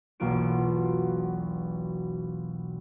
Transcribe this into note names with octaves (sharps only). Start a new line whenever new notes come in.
E1 B1 A#3 F4 F#4 D7